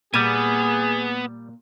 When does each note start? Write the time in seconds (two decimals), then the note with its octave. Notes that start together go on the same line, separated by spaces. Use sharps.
0.14 A#2 G3 B3 G#4 G#5